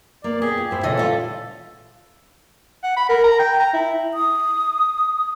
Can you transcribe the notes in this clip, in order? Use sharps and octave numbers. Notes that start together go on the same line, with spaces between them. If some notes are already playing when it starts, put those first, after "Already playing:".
A#3 B3 D5
B3 G4 G#4
F4
A2 E4 C5
A#2 C#3 E3 A4 D#5
G3 F4
F#5
B5
A#4
A#5
G5
A#5
E4
D#6